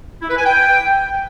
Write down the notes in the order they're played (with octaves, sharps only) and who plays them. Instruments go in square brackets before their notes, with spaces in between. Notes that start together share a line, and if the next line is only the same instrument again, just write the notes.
[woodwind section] E4
B4
G#5
G5